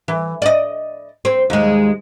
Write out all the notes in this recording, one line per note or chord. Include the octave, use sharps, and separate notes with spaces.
E3
D5 D#5
C4
D#2 G#3